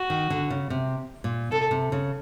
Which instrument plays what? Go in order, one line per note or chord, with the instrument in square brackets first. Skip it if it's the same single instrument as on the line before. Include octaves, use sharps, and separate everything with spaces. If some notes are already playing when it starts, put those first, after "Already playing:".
Already playing: [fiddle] F#4
[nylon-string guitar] D#3
D3
C#3
C3
A#2
[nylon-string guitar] C3 [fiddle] A4
[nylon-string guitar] C3
C#3